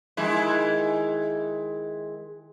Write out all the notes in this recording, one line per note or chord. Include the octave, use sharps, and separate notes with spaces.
D#3 G#3 E4